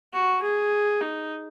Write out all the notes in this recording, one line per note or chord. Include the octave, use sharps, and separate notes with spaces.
F#4
G#4
D#4